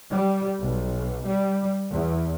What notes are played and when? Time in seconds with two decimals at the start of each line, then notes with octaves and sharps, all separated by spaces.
0.11 G3
0.60 B1
1.27 G3
1.92 E2